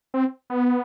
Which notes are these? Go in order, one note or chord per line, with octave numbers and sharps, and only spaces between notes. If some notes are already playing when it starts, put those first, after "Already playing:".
C4
B3